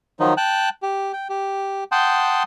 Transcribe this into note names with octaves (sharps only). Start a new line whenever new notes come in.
D#3 F3 F#3 D#4
G5 A5 F#6
G4
G5
G4
F#5 G5 A5 C6 D#6 G6